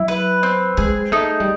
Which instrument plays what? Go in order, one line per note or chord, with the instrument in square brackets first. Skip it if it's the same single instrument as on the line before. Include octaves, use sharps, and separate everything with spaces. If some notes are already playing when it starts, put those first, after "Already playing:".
Already playing: [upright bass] F#3 [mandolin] E4
[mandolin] B4
C4
[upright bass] G#3 [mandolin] G#4
[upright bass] A3 [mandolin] D#4
[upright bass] G3